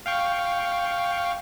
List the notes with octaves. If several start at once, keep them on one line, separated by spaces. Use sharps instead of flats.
F5 G5 C#6